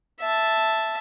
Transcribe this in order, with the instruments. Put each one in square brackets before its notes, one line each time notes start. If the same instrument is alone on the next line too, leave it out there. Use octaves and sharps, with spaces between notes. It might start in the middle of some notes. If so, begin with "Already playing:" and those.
[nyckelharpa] E5 A5